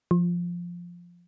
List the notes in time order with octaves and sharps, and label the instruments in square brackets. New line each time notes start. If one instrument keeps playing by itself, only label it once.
[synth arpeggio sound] F3